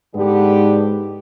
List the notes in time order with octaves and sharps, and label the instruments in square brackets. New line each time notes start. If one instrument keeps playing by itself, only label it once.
[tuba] G#2 [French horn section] D3 B3 G4